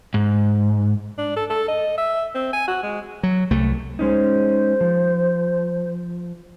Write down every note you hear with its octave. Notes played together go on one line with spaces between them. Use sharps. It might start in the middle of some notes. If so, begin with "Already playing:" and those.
G#2
D4
A4
A4
D#5
E5
C4
G#5
F#4
G#3
F#3
C2 A3
G#3 C#4 D#4 C5
F3